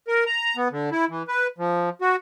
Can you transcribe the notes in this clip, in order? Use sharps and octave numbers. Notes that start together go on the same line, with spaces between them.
A#4
A#5
B3
D3
E4
E3
B4
F3
F#4